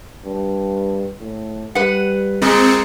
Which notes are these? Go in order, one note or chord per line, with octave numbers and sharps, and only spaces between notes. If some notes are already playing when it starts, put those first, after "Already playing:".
G2
A2
G3 B4 F#5
A#2 G#3 C4 C#7